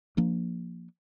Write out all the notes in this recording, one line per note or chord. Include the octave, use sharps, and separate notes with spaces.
F3 A#3 D4